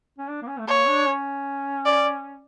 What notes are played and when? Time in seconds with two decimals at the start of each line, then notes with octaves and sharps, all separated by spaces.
0.18 C#4
0.28 D4
0.42 A#3
0.47 C#4
0.59 A3
0.67 A#3 C#5
0.88 D4
1.06 C#4
1.85 D5